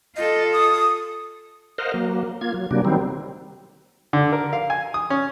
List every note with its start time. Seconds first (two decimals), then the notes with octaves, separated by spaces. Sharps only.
0.16 F4 A4 D#5
0.53 D#6
1.78 A#4 C5 D#5 F5 F#5
1.94 F#3 A#3
2.41 A#3 F4 G#6
2.54 F#3
2.71 C3 F#3 G3 A#3 D4
2.85 D#3 F#3 G3 C4
4.13 D3
4.32 A#4
4.53 F5
4.70 G#5
4.94 D#6
5.10 C#4